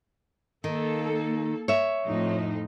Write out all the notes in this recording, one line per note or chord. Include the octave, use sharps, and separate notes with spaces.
D#3 A#3 A4
C#5 E5
F2 A2 D#4